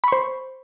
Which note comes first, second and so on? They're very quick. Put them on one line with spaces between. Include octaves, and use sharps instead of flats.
B5 C#6 C5